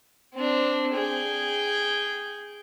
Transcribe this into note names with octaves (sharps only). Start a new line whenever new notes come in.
C4 D4
G#4 G5